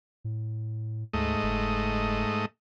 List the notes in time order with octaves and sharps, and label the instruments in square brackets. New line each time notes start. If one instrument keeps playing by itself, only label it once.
[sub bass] A2
[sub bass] D2 [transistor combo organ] G#2 A3 D#5
[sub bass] F#1